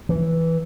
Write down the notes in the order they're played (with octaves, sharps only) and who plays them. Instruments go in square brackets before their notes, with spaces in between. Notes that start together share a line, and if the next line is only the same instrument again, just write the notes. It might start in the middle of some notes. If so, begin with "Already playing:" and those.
[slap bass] E3